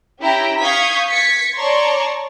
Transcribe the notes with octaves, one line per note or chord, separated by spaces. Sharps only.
C#4 E4 G4 G5 A#5
F5 C#6 D#6 G6 G#6 B6
G#6 A6 B6 C#7
C#5 D5 A5 A#5 C6 C#6